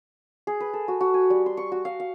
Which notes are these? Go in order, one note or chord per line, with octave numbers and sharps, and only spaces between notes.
G#4
B4
A4
F#4
F#4
G#5
G3
C6
C#6
F#4
F5
F5